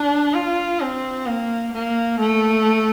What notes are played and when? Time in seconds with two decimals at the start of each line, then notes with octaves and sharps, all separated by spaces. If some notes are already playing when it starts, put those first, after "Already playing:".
Already playing: D4
0.34 F4
0.81 C4
1.27 A#3
1.73 A#3
2.20 A3